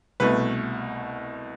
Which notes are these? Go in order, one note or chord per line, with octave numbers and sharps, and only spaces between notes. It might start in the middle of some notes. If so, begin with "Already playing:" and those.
C2 B2 A3 B4